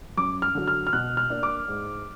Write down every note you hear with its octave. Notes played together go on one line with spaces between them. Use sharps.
F#2 D6
F6
D3 F#3
F6
F6
B2 F#6
F6
A#3 D4
D6
G#2